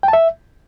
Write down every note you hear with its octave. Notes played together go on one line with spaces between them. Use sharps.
G5
A5
E5